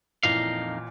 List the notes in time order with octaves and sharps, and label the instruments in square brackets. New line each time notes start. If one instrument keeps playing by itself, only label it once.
[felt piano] A1 A#2 E3 [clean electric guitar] F2 D#4 F5